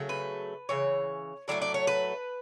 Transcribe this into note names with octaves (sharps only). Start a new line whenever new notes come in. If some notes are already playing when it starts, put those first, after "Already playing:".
Already playing: C#3 F#3 A3
B4
C#3 E3 C#5
A2 F#3 A3 D5
D5
C#5
B4